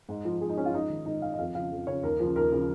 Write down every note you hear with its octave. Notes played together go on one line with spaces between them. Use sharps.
G#2
F3
G#2 G#4
D#4
F3 C#4
F4
G#2 D#4
D#3
G#2 D#4
D#3 F5
D#5
F2 F5
C#3 F3 F5
F2
C#3 F3 C#5
D#2 A#4
C#3 F3
D#2 A#4
C#3 F3